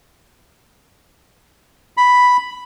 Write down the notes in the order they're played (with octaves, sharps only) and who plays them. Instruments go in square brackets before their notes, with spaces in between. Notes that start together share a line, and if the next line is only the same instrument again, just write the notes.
[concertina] B5